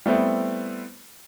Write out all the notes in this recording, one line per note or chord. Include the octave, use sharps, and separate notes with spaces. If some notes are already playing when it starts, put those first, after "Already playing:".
G3 A3 B3 C4 E4